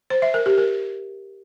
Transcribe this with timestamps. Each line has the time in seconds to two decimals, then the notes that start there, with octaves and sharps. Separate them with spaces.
0.10 C5
0.22 E5
0.34 A#4
0.46 G4
0.58 A#4